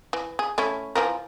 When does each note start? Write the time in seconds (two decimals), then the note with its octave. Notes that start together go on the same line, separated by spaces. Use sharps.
0.13 E3
0.39 G#4
0.58 A3 C#4 E4
0.95 E3 F3 A#4